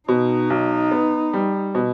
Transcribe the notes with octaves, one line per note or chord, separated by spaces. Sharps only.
B2 D#4
B1
B3
G3
B2